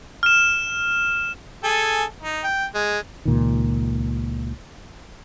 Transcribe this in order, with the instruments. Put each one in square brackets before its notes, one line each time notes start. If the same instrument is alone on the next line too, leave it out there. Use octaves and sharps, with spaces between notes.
[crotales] F6 E7
[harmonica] G#4 A4 G#5
D#4
G5
G#3
[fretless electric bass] C#2 A#2 D#3